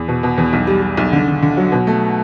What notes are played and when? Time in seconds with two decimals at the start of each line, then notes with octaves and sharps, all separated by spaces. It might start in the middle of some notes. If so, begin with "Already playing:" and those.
Already playing: E2
0.08 B2
0.23 B2
0.38 E2
0.53 B1
0.67 G3
0.82 G3
0.97 B1
1.13 D3
1.28 D3
1.43 D3
1.57 F#3
1.72 B2
1.87 A3